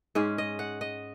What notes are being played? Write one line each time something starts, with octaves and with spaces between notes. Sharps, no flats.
G#2 G#3 C#4
D#5
F#5
D#5